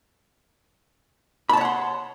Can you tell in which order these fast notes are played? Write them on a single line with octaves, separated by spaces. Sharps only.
B5 A5 C#5 F#5 C6